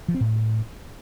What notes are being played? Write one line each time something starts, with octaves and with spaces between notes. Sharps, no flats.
F3
C4
A2